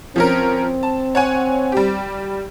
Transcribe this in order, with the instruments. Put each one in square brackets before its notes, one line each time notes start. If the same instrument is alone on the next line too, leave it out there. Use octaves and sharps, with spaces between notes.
[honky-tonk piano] F3 C#4 A#4 [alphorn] C4
[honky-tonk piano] A5
C#5 F#5 G#5
G3 G4